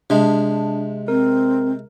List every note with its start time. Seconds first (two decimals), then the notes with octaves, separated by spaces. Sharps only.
0.10 C3 G#3 D4
1.08 C4 A#4